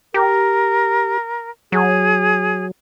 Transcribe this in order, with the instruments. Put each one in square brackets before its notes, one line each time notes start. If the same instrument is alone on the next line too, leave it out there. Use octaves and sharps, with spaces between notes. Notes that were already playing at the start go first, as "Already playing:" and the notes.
[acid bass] G4 [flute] A#4
[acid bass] F#3 [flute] G#4